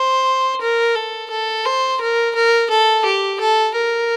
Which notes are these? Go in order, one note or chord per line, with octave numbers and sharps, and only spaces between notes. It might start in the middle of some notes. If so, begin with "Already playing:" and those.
Already playing: C5
A#4
A4
A4
C5
A#4
A#4
A4
G4
A4
A#4